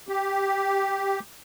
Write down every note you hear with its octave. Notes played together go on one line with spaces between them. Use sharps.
G4